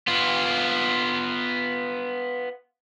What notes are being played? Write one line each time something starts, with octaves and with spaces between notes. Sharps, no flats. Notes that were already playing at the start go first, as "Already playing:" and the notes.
B3 F4